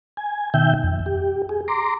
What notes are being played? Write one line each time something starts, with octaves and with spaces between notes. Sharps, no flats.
G#5
B2 D#3 E5 G5 G6
F2
G4
G#4
A#5 C6 D6